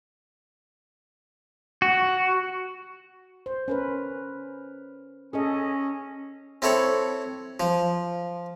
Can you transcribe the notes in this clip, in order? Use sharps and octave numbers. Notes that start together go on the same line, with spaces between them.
F#4
C5
C#4 A#4 B4
C#4 G#4 A4 D#5
C4 E4 A4 C#5 B5
F3